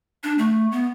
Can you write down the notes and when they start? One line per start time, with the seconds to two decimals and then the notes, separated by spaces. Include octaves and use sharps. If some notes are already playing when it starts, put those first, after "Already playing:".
0.24 D4
0.38 A3
0.72 B3